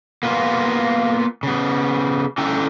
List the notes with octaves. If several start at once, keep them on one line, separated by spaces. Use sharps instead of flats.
A#3 B3 F4
C#3 B3
D3 C#4 E4 G5 A#5